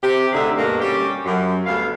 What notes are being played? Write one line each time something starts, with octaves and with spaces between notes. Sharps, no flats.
C3 G4
D2 D3 D#4 G#4 E5
G2 B2 A3 A#3
G3 C#4 G4
F#2
D2 G3 B3 F5